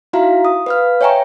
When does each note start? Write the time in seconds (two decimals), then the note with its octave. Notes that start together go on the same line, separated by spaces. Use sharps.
0.13 D#4 E4 F#4 E5 F5 A#5
0.45 D#6
0.66 B4 F5 F6
1.01 C#5 E5 G5 G#5 A#5 C#6